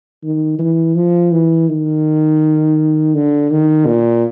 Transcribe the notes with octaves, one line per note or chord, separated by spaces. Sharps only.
D#3
E3
F3
E3
D#3
D3
D#3
A#2